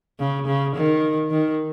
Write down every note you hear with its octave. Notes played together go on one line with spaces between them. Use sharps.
C#3
C#3
D#3
D#3